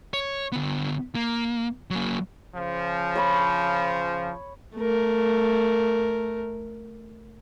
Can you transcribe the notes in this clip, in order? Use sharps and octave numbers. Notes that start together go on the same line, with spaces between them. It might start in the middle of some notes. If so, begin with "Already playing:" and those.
C#5
D3 B3
A#3
F#3 A#3
C#3 F3
C#5 B5
A3 A#4